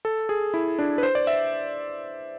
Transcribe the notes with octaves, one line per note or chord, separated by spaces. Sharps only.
A4
G#4
E4
D4
B4
C5
D5
E5